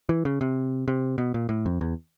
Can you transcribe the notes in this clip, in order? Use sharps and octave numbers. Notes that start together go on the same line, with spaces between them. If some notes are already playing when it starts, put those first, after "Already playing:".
E3
C#3
C3
C3
B2
A#2
A2
F2
E2